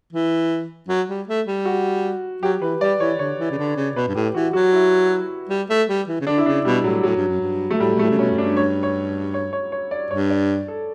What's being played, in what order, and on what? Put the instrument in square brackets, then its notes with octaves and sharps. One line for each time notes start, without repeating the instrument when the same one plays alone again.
[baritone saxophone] E3
F#3
G3
A3
G3
[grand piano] F#4
[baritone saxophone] F#3 [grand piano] G4
[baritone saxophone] E3 [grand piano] B4
[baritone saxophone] G3 [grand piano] D5
[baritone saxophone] E3 [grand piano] C#5
[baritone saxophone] D3 [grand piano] C#5
[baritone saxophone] E3
C#3
D3
C#3
[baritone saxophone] B2 [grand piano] B4
[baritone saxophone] G2
[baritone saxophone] A2 [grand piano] G4
[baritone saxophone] E3 [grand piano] F#4
[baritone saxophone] F#3 [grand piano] F#4
[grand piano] E4
[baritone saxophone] G3
A3
G3
E3
C#3
[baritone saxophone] D3 [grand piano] D4
[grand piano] E4
[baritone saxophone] C#3 [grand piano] D4
[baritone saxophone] B2 [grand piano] G3
[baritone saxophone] A2 [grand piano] F#3
[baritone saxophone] A2 [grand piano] F#3
[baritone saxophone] G2
F#2
G2
[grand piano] A3
[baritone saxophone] A2 [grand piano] G3
[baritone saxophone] B2
[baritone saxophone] A2 [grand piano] A3
[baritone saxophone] C#3
[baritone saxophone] B2 [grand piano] C#4
[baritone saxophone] F#2
[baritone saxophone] G2 [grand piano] D4
[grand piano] C#5
C#5
C#5
C#5
C#5
D5
[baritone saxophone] G2 [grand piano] C#5
[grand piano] D5
A4